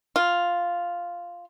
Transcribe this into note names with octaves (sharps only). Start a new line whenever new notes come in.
F4